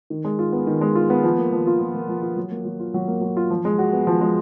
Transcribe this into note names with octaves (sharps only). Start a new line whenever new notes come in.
D#3
G#3
F4
B3
D#3
G#3
F4
B3
F3
A#3
F3
F4
F3
A#3
F3
F4
F#3
A#3
F#3
F4
F#3
A#3
F#3
F4
F3
G#3
F#4
B3
F3
G#3